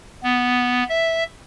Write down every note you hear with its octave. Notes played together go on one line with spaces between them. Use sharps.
B3
E5